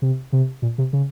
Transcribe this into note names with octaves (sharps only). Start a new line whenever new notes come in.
C3
C3
A#2
C3
C#3